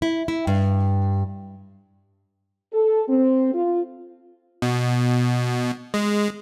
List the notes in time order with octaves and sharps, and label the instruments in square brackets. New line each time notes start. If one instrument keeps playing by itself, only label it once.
[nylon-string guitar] E4
E4
G2
[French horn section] A4
C4
F4
[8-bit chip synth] B2
G#3